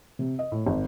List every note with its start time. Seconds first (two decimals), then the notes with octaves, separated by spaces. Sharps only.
0.19 C3
0.39 D#5
0.52 A2
0.66 G#1